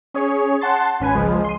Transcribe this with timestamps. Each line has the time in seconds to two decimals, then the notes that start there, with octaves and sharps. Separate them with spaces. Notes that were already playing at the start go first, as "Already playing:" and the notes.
0.14 C#4 G#4 C#5
0.61 F#5 A5 C6 A6
1.00 G#1 C#4 B4 G#5
1.15 C#2 F3 G#3
1.44 C6 D#7